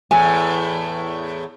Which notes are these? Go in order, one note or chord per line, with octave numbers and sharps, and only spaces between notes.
E2 A2 G#5